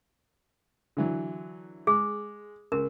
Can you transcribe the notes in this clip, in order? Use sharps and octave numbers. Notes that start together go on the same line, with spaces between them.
D3 E3 F#3
G#3 G#4
C#2 A#4